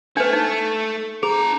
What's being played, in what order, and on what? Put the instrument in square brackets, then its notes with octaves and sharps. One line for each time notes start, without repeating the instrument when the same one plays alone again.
[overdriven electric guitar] A3 [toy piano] D4 B4
[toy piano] D#4
[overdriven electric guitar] D4 A#5 [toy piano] G#4